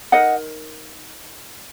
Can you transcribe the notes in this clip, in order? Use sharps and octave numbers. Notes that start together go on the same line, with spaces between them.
D#4 A#4 D#5 F#5